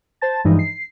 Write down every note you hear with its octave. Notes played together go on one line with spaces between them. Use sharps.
C5 A5 A6
G2 E3 F3 G#3 D#4
C7